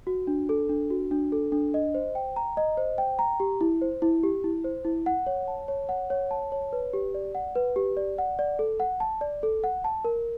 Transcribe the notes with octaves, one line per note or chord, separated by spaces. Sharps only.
F#4
D4
A4
D4
F#4
D4
A4
D4
D#5
C5
G5
A#5
D#5
C5
G5
A#5
G4
E4
C5
E4
G4
E4
C5
E4
F#5
C#5
A5
C#5
F#5
C#5
A5
C#5
B4
G4
D5
F#5
B4
G4
D5
F#5
D5
A4
F#5
A5
D5
A4
F#5
A5
A#4